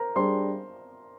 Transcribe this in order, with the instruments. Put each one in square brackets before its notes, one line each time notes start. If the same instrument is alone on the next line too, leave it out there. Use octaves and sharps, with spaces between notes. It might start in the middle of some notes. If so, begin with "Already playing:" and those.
Already playing: [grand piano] A#4 C5 A#5
[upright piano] G3 D4 G#4 [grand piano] C5 C6